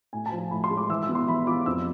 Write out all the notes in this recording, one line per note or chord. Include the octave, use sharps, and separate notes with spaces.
A2 G#5
A5
F3
A5
A2 B5
C6
G#3
D6
E3 E6
E6
B3
C6
E3 B5
F4 D6
F2 E6